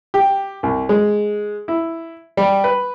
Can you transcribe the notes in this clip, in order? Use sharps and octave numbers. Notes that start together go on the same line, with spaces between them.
G4
C2
G#3
E4
G3
B4